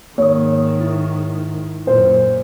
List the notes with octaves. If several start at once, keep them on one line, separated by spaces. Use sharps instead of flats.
G#2 D#3 A#3 C#5 D#6
E4
F#2 A#2 C5